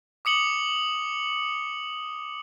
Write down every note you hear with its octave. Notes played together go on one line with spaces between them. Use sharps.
D6 D#6 C#7 F#7 G7